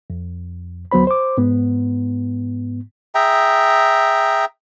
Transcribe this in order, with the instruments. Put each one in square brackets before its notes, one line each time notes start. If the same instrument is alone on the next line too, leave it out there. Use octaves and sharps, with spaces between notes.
[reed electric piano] F2
D2 F#3 B3 C5 B5
C5 D6
G#2 B3
[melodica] G#4 E5 G5 A#5